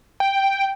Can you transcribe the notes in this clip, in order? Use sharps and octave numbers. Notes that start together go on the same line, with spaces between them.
G5